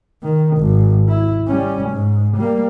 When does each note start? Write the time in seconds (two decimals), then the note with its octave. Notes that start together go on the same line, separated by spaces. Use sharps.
0.22 D#3
0.57 G#1
1.09 E4
1.47 G3 C#4
1.90 G#2
2.37 G3 A#3